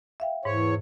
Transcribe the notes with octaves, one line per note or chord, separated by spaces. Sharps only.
E5 F5 G5
E2 G#2 C5 C#5